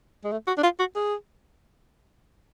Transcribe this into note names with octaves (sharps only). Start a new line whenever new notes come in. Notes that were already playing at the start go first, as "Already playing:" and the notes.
G#3
A3
F#4
D4
F4
F#4
G#4